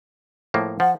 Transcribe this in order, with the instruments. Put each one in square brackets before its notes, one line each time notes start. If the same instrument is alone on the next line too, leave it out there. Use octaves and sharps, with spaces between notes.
[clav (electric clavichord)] A2 F3 A#3
[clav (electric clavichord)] F3 [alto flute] F#5